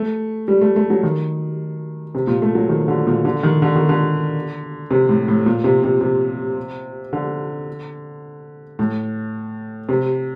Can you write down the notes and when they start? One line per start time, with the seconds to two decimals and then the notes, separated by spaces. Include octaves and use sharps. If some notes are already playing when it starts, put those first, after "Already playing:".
Already playing: A3
0.48 G3
0.61 A3
0.76 A3
0.90 F#3
1.03 D#3
2.15 C3
2.27 A#2
2.42 A3
2.55 F#3
2.69 D#3
2.88 D3
3.07 A#2
3.25 D3
3.43 D#3
3.62 D3
3.75 D#3
3.89 D3
4.91 C3
5.09 A2
5.28 A2
5.46 A#2
5.64 C3
5.84 C3
6.01 C3
7.13 D3
8.79 A2
9.89 C3